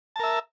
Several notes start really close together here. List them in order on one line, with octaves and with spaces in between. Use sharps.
A5 A#4 E5